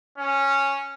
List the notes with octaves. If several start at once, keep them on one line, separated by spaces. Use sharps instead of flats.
C#4